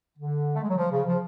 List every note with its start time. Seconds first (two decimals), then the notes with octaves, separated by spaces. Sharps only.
0.18 D3
0.53 A3
0.62 G#3
0.69 F#3
0.76 F3
0.91 C#3
1.06 F3